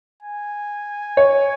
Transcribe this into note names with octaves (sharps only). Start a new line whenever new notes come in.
G#5
C#5